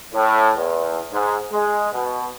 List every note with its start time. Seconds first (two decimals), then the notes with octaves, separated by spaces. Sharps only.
0.13 A2
0.57 E2
1.12 G#2
1.52 G#3
1.92 B2